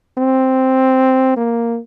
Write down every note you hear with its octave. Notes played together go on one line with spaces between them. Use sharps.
C4
A#3